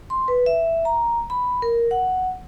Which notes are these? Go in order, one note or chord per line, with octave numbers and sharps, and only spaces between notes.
C6
B4
E5
A#5
B5
A#4
F#5